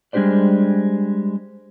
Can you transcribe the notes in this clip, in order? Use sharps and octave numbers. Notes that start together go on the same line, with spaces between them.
G3 G#3 D4 G4 C5 D5